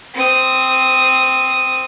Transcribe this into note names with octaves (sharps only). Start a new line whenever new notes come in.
C4 D#6